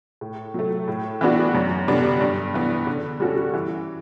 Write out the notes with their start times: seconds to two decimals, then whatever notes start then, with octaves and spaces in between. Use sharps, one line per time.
0.21 A2
0.54 F#3 A3
0.88 A2
1.21 E3 B3 D4 F#4
1.54 F#2
1.88 D3 G3 B3 D4
2.21 G2
2.54 E3 B3
2.87 D3
3.20 G3 C#4 F#4 A4
3.54 E3